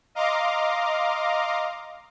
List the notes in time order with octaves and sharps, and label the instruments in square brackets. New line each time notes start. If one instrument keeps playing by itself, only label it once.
[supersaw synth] D#5 F5 A#5 C6 D6